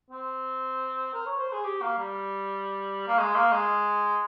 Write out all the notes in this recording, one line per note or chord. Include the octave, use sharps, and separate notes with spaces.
C4
A#4
C#5
C5
G#4
G4
A#3
G3
A#3
G#3
A#3
G#3